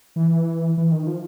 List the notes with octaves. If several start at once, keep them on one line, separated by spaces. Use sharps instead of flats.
E3
E3
D#3
F3